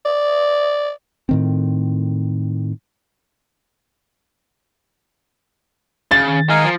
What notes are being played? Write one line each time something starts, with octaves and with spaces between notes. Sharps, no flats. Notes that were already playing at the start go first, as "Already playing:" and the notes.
D5
A2 D#3 C4
C#3 A6
D#3
G#3 D#4 A#4 F5 G#5
F3